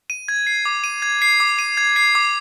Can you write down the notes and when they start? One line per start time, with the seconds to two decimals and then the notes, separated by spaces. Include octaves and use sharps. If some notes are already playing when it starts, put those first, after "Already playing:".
0.10 D#7
0.28 G#6
0.47 C7
0.65 D6
0.84 D#7
1.02 G#6
1.22 C7
1.40 D6
1.59 D#7
1.77 G#6
1.96 C7
2.15 D6